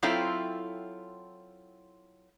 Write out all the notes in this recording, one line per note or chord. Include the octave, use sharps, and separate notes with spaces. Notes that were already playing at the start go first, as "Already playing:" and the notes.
F#3 C4 E4 F4 A4 G5